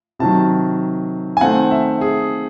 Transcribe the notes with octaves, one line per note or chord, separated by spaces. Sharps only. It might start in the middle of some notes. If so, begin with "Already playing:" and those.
C3 D#3 F#3 A5
G#5
D#3 A3 C4 F#5
E5
G#4